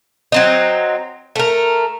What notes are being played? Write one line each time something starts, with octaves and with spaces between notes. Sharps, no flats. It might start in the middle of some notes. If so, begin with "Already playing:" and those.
F#3 C4 D#4
A3 A#4